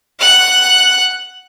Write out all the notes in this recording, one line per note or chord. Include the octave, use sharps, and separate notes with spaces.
F#5 F#6